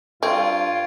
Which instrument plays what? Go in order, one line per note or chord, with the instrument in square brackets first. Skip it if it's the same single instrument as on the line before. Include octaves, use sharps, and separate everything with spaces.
[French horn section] G2 [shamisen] C4 [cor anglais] F4 [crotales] C#6 G#6 D7